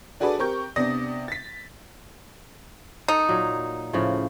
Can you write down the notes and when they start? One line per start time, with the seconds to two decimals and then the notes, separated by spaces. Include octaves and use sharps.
0.20 D4 F#4 G#4 A4 B4 D5
0.39 C4 G4 A#4 C#6 G6
0.76 C3 B3 D4 D5 D#6 A#6
1.28 A6 B6
3.08 D#4 A4
3.29 A#2 F#3
3.93 A2 C#3 F3